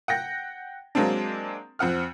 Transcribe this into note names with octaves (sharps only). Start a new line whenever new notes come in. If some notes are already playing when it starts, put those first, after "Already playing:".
F#5 G5 A#6
F#3 G#3 A#3 C4 D4
F2 C4 F#5 F6